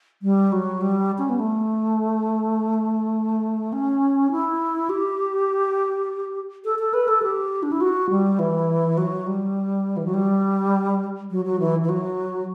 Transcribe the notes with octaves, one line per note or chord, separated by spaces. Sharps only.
G3
F#3
G3
C#4
B3
A3
C#4
E4
G4
A4
A4
B4
A4
G4
D4
E4
F#4
G3
E3
F#3
G3
E3
F#3
G3
F#3
F#3
E3
E3
F#3